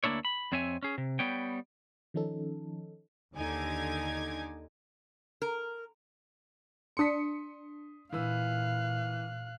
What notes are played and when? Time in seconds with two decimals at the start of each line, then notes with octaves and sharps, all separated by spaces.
0.04 D2 A#3 C#4 D4 E4 C#5
0.25 B5
0.52 F2 C4 C#5 E5 G#5
0.83 C#4 G#4
0.98 C3
1.19 G3 B3 C#5 G5
2.14 D#3 F3 C#4 D#4 A4
3.34 D#2 D3 D#4 G#5 D6 G#6
5.42 A#4
6.97 D4 C6 D#6 B6 C#7
8.13 A#2 E3 B4 F5 E6 F#6